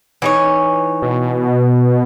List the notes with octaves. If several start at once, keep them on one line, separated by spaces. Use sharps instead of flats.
E3 D#4 C#5
B2